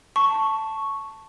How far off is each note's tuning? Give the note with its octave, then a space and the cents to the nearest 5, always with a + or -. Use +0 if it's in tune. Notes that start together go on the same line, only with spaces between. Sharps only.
A5 +0 C#6 +0